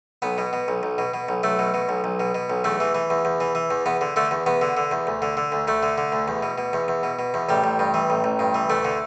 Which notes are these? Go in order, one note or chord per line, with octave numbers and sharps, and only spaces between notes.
B1 B3
B2
B2
B1
B1
B2
B2
B1
B1 A3
B2
B2
B1
B1
B2
B2
B1
E2 A3
E3
E3
E2
E2
E3
E3
E2
E2 B3
D3
D3 A3
E2
E2 B3
D3
D3
E2
D2
D3
D3
D2
D2 A3
D3
D3
D2
E2
B2
B2
E2
E2
B2
B2
E2
A1 G3
A1
G2
E3
A1
A1
G2
E3
D2 A3
D3